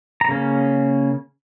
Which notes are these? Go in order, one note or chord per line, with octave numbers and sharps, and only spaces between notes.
A#5
C#3 A#3 C#4